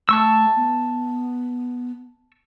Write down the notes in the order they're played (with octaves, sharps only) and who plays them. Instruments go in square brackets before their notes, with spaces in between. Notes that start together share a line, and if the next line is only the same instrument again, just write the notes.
[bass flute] A3 [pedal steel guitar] A5 C#6 E6
[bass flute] B3